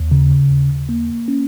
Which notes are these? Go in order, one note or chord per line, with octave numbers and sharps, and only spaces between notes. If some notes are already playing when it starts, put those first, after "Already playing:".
Already playing: D#2
C#3
D#2
A#3
C#4